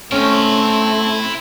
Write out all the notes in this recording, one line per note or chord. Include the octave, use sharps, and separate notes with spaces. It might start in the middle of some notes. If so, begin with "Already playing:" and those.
A3 C4 C#4 E4 G5